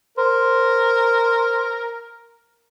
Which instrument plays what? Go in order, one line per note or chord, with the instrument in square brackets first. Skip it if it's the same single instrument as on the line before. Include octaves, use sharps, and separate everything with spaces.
[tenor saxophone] A#4 [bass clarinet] C5